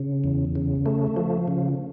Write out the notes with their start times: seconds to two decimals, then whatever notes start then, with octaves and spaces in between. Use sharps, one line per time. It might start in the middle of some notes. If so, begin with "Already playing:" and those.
Already playing: C#3
0.24 E2
0.56 C#3
0.86 A3
1.16 F3
1.48 C#3